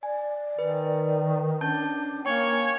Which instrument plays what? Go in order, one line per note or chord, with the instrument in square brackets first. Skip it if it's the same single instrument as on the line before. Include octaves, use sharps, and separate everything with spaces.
[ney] D5 [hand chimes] G#5
[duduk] D#3 [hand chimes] B4
[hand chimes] C#4 A5 G6 [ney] D4
[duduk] A#3 [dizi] C#5 [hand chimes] G5 C#6 [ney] G#5